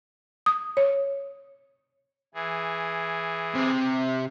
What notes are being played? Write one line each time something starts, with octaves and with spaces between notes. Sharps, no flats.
D#6
C#5
E3 G#4
C3